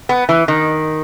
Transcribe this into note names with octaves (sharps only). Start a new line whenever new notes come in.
B3
E3
D#3